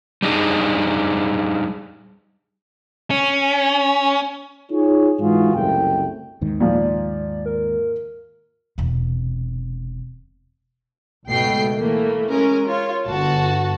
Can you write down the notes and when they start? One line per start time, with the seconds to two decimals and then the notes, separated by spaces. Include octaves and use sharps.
0.22 G3 D4 D#4 G#4
3.11 C#4
4.72 D#4 F4 G#4 C#5
5.20 G#2 E3 F4 F#4 G#4
5.55 F#1 C2 A3 G5
6.41 D#2 G#2 D#3
6.60 A#2 F3 D5
7.46 A#4
8.78 E1 C3
11.27 C#2 G#2 B2 A3 G5 C7
11.77 E3 A3 A#3
12.30 G#3 C#4 A#4
12.66 F4 C#5
13.06 G1 F#4 A5